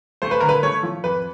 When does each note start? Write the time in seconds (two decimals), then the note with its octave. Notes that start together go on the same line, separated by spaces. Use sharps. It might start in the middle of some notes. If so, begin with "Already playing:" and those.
0.22 A3 C5
0.31 B4
0.41 D3 A#4
0.49 B4
0.63 A3 C#5
0.83 F3
1.04 F2 B4